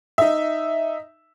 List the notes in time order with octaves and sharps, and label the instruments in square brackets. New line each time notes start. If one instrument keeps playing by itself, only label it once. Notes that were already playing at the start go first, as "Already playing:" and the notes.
[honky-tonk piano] D#4 E5